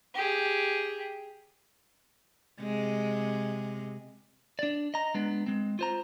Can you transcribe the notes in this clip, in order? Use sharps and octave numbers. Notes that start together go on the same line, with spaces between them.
G4 G#4
C3 G#3
D4 D5
D#5 A#5
G#3 B3 D4
G#3 C4
F4 C5 A#5